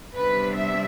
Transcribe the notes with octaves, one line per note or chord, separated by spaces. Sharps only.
C3 G3 B3 D4 B4
E5